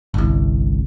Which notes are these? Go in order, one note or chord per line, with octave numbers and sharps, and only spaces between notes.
G1 C2